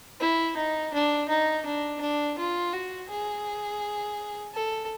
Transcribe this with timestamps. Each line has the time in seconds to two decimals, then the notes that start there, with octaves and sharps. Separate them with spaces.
0.20 E4
0.57 D#4
0.94 D4
1.29 D#4
1.66 D4
2.01 D4
2.38 F4
2.73 F#4
3.10 G#4
4.54 A4